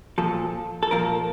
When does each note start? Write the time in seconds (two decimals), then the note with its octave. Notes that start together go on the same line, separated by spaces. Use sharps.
0.18 A#2 F3 A4
0.83 A4
0.91 A#2 F3 A#4